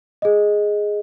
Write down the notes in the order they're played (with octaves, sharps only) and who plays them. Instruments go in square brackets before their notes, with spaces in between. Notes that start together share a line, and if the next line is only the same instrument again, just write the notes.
[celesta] G#4 D#5